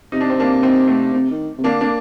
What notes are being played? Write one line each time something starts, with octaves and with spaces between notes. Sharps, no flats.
C3 D#4
D4
C4
A#3 D4
C4 D#4
A3 C4
C3
D#3
C3
D3 A#3 D4
A#3 D4